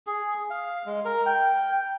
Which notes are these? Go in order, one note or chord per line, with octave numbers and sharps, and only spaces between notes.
G#4
F5
G#3
A#4
G5